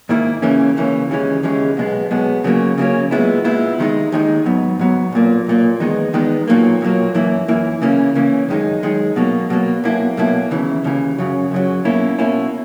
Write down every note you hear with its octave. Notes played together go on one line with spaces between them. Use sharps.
G#2 D#3 A#3 E4
C#2 C#3 E3 A#3 C#4
C#2 C#3 E3 A#3 C#4
D#2 C#3 E3 G#3 C#4
D#2 C#3 E3 G#3 C#4
B1 B2 G#3 B3
B1 B2 G#3 B3
C#3 F#3 A#3 C#4
C#3 F#3 A#3 C#4
A#2 G#3 B3 E4
A#2 G#3 B3 E4
D#2 D#3 G#3 D#4
D#2 D#3 G#3 D#4
G#2 F#3 B3
G#2 F#3 B3
B1 A#2 A#3
B1 A#2 A#3
E2 D#3 G#3 B3 D#4
E2 D#3 G#3 B3 D#4
B1 A#2 F#3 A#3
B1 A#2 F#3 A#3
F#2 E3 A#3 E4
F#2 E3 A#3 E4
C#3 E3 A#3 C#4
C#3 E3 A#3 C#4
F#2 D#3 G#3 D#4
F#2 D#3 G#3 D#4
B2 F#3 A#3
B2 F#3 A#3
B1 B2 A#3 E4
B1 B2 A#3 E4
D#2 C#3 E3
D#2 C#3 E3
F#2 C#3 F#3
F#2 C#3 F#3
B2 A#3 C#4 E4
B2 A#3 C#4 E4